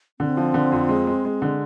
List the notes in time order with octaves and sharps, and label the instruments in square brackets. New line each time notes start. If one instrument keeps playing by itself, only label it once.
[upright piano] D3 [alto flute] C4
[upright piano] F3
D3
F2
G#3
G#3
G#3
D3